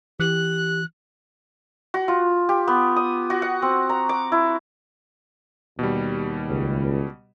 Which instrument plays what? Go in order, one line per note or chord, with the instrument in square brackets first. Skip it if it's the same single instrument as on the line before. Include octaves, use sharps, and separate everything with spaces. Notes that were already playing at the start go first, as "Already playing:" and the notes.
[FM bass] E3 [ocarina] G4 [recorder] F#6
[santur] F#4
F4
G4
B3
D#6
F#4
F#5
C4
A#5
D6
E4
[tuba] D#2 [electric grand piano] B2 G3
[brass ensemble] C#2